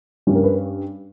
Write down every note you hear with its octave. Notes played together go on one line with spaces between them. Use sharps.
G2 G3 C#4
A#4
B4